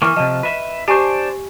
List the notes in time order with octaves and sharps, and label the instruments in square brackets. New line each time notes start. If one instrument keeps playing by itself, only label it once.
[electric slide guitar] E3 A#3 [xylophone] C#6 F6
[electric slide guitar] C3 F3 [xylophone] D#5
[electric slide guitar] B4 E5
[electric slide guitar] D4 C5 [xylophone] G4 G#5 C#6